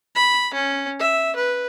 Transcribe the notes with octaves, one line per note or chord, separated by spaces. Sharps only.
B5
C#4
E5
B4